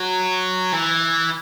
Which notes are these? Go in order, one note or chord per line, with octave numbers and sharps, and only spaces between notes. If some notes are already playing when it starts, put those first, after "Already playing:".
Already playing: F#3
E3